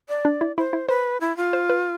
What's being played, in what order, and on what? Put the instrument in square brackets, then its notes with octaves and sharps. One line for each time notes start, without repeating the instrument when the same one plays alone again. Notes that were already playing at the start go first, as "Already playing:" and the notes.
[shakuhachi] D5
[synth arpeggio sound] D4
E4
[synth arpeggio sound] E4 [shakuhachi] C5
[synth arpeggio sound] E4
[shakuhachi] B4 [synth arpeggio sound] C5
[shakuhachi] E4
F4
[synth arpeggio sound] C5
B4